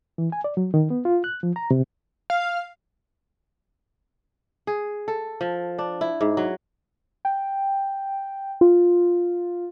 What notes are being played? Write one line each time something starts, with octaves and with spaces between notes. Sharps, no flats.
E3
G#5
D5
F#3
D#3
B3
F4
F#6
F3
A#5
C3
F5
G#4
A4
F3
D4
E4
G#2
F#3
G5
F4